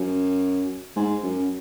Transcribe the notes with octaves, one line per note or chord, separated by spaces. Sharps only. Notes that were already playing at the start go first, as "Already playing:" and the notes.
Already playing: F#2
G#2
F#2